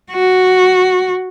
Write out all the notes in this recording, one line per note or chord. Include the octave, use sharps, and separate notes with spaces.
F#4